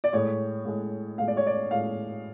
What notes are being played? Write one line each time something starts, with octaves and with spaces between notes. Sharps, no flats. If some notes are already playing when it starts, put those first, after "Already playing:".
D5
A2 G#3 C#5
A2 G#3
A2 G#3 F5
D5
C#5
D5
A2 G#3 F5